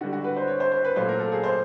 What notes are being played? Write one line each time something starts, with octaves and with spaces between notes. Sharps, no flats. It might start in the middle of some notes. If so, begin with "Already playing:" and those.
D3 G3 F#4
F#4
B4
C5
C#5
C5
C5
B4
A#2 F#3 A3 C5
A#4
A4
G#4
C5